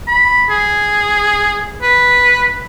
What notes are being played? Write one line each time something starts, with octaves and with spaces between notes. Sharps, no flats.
B5
G#4
B4